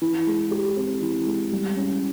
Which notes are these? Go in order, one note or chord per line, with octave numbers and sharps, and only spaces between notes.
E3
G#3
G4
C4
E3
G#3
G3
C#4